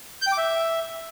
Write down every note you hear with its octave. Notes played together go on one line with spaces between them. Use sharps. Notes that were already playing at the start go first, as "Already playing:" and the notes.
G6
G5
D6
E5